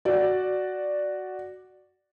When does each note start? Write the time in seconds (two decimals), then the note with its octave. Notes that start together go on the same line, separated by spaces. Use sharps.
0.05 F#4 D5